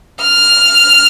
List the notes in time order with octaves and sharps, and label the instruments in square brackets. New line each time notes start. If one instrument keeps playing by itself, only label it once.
[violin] F6